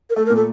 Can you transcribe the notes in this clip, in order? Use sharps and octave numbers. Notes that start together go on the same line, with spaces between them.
A#4
A3 A4
A#4
A#2
A4